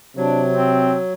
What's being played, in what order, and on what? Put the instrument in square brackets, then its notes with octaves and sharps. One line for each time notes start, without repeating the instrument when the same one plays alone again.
[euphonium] C3 [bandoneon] F#3 [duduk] D4
[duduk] C4